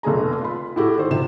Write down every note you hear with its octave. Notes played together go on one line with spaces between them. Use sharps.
F1 B1 A3 G#4 A#5
F4 B5
A2 E4 F#4 G4 A4
D#3 C5
C3 F3 E7